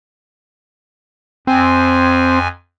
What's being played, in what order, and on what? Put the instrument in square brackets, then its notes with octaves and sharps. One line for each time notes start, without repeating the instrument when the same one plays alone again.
[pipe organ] F2 G#5 [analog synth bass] C4